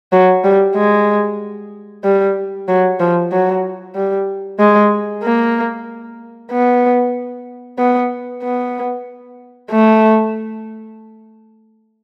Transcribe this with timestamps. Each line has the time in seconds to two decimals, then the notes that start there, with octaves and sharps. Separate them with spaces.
0.12 F#3
0.44 G3
0.76 G#3
2.04 G3
2.68 F#3
3.00 F3
3.32 F#3
3.96 G3
4.59 G#3
5.23 A#3
6.51 B3
7.79 B3
8.43 B3
9.71 A3